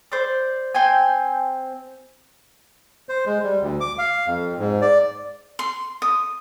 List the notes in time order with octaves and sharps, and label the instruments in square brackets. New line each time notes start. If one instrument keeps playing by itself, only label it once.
[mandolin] C5 D5
C4 G5 G#5
[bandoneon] C5
G#3
G3
D2
D6
F5
F2
G#2
D5
[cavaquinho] C6
D#6